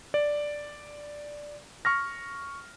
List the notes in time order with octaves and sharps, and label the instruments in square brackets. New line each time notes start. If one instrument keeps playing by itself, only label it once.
[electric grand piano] D5
C#6 F6 A#6